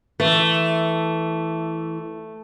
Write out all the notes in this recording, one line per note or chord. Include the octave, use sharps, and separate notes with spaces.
E3 A3